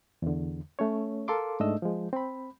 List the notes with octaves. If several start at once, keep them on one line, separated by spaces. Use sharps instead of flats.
E2 D3
A3 C#4 C#5
A4 A#4 F5 C6 D6
G#2 A3 D4 D#5 E6
F3 G#3
C4 B5